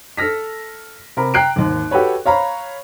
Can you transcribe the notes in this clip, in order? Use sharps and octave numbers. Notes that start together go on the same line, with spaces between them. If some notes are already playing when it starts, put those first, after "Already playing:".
A4 F6 A#6 B6
C3 A#4 B5
G5 A#5 F#6 C7 D7
G#1 D#2
F#4 G4 A4 B4 C#5
C#5 F5 A#5 B5